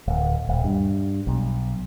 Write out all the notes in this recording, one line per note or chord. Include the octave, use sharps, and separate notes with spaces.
D1
D#1
G2
B1